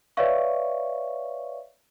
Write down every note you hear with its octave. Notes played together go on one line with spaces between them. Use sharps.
B4 C#5 D5 E5 F5 C#6